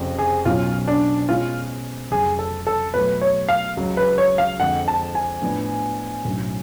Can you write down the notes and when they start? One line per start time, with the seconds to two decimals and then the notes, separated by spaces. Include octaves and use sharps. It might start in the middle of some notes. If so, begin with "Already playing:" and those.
Already playing: F1 F2 C#3 F3
0.19 G#4
0.45 B1 B2 F#3 C#4 F4
0.88 D4
1.28 B2 G#3 C#4 F4
2.11 F1 F2 C#3 F#3 G#4
2.39 A4
2.67 A4
2.94 B2 F#3 A3 B4
3.21 C#5
3.49 F5
3.77 C#2 C#3 F#3
3.97 B4
4.18 C#5
4.38 F5
4.60 F2 D3 G#3 F#5
4.88 A5
5.15 G#5
5.42 A2 F3 B3 D4
6.25 B1 A2 F#3 C#4